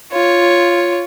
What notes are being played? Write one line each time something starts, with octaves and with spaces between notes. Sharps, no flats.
F4 C#5